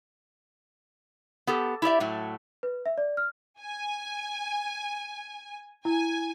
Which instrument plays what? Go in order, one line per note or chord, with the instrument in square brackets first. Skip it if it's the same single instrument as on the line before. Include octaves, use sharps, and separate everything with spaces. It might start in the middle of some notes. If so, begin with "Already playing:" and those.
[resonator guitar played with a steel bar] B3 G4 A4
E4 G4 D5 E5
A2 F#3 A3
[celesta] B4
E5
D5
F6
[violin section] G#5
[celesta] E4 [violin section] G#5